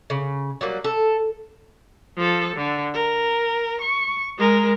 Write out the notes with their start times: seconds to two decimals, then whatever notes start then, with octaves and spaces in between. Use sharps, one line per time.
0.10 C#3
0.61 F#3 G3 A#3
0.84 A4
2.17 F3 A4
2.56 D3
2.94 A#4
3.81 C#6
4.38 G#3 A#4